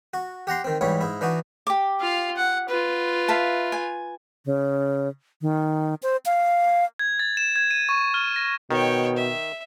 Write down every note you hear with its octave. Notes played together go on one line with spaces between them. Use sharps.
F#4
G4 F#5 A#5 C6
D#3 C4
G#2 E3 G3 C#5
G#2 E4
E3 D4 D#4 F#4
G4 D6
F4 F5
F#5
F4 B4
E5 F5 A5
G#5
C#3
D#3
C5
F5
G#6
A6
E7
G#6
D#7
C#6
F6
A#6
B2 D#3 C#5 G5
E5